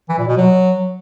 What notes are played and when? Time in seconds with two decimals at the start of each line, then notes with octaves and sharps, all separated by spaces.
0.09 E3
0.18 A#2
0.28 B2
0.37 F#3